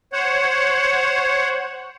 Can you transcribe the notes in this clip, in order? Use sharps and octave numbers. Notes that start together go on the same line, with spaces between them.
C5 C#5 F#5